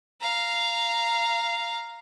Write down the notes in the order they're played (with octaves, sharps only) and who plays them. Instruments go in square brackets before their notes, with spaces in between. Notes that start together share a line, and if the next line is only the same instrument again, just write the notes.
[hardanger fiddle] F5 A#5